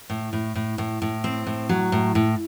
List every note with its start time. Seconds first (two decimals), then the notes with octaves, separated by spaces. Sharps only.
0.10 A2
0.33 A2
0.55 A2
0.78 A2
1.02 A2
1.24 C4
1.47 A2
1.69 F#3
1.92 A2
2.15 A2